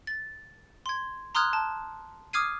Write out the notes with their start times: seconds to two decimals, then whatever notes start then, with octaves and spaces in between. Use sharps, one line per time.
0.07 A6
0.86 C6 G#6
1.35 A#5 C6 D#6 F6 F#6 G#6
1.53 A5
2.33 D6 D#6 F6 G#6 C7 D#7